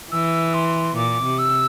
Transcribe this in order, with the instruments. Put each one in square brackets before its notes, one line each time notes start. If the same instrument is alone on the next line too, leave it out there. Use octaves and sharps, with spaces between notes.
[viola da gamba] E3 [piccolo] E6
[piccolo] C6
[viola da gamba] A#2 [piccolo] D6
[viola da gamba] C3
[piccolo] E6